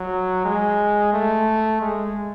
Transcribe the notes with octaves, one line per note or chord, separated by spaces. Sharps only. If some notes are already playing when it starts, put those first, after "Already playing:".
Already playing: F#3
G#3
A3
G#3